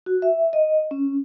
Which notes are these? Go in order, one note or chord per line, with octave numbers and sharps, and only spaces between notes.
F#4
E5
D#5
C#4